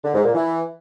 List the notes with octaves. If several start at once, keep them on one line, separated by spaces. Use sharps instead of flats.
D3
G#2
A#2
E3